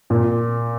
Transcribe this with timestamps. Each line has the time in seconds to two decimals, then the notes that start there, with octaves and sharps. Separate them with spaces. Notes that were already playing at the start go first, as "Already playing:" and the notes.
0.10 A#2